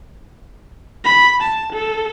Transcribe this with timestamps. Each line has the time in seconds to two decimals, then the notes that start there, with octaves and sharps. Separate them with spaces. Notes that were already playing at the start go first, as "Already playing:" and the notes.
1.05 B5
1.42 A5
1.73 A4